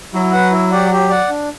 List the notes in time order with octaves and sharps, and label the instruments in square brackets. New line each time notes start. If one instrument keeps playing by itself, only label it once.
[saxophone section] F#3 [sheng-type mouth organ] E4
[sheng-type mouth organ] B4 F#5
E4
G4 D5 F#5
G4
D5 F#5
D4